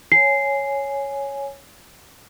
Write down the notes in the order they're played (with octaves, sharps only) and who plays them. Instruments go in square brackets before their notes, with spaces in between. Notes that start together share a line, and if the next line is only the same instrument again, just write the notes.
[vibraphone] C#5 G#5 [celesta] C7